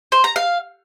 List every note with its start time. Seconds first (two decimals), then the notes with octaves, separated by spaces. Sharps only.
0.12 C5
0.24 A#5
0.36 F5